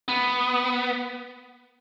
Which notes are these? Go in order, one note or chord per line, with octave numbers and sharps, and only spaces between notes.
B3